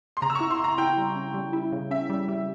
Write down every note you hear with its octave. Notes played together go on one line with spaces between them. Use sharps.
C6
C#3 A#5
E6
C#6
E4
C6
E4 A#5
E4 G5
G3
C#4
G3
E4
C#3
C#4 E5
G3
G3